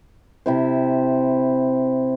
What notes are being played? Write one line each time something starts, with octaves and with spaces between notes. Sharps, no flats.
C3 E4 C5